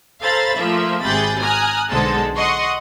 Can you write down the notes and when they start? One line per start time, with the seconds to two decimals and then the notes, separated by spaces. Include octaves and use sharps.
0.22 A4 C5 F5 A#5 B5 A6
0.56 F3 A3 A#3 E5
1.04 G#1 C3 G#4 B5 G6 A6
1.39 G#5 A#5 D#6 F6 F#6
1.90 B1 D3 G#3 A4 C5 A5
2.37 D#5 F#5 C6 C#6 D#6